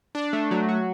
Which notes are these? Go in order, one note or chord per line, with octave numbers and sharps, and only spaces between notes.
D4
A3
F#3
F#4